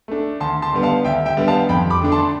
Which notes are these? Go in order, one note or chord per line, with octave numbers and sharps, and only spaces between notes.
A3 D4
D2 A5 C6
A5 C6
D3 G3 B3
F5 A5
D2 E5 G5
E5 G5
D3 G3 B3
F5 A5
F2 G5 B5
B5 D6
D3 A3 D4
A5 C6